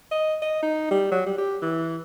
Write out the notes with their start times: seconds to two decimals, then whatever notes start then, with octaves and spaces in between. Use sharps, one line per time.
0.11 D#5
0.42 D#5
0.62 D#4
0.91 G3
1.12 F#3
1.26 G3
1.38 G4
1.62 E3